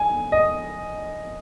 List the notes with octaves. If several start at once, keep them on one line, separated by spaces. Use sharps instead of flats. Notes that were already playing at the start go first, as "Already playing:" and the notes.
Already playing: G#5
D#5